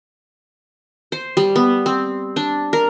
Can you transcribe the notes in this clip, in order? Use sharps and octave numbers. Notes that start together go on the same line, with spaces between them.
C5
G3
B3
C4
D4
A#4